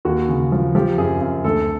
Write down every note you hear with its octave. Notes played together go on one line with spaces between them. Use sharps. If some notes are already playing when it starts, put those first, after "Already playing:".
D#2 F#4
C#3
F3
F3 G4
F#2 G#4
F#2
D2 A4